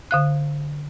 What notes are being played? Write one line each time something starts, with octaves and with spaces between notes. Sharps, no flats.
D3 F5 F#6